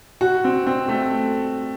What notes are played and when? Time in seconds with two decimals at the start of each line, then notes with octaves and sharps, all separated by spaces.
0.21 F#4
0.44 C4
0.67 C4
0.88 A3